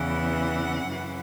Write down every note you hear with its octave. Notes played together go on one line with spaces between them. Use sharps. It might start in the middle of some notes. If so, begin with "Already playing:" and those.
Already playing: E2 C#3 E3 F#5
F#2 C#3 E3